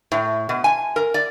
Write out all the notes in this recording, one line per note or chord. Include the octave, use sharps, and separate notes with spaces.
A2
B2
G#5
A#4
D5